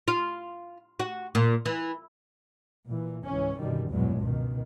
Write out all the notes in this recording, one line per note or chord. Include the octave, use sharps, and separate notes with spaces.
F4
F#4
A#2
E3
A#2 E3
C#2 G#2 E3 C#4
B1 F#2 D3 D#3 G3
A#1 E2 G2 B2 F#3 G#3
C#2 B2 D#3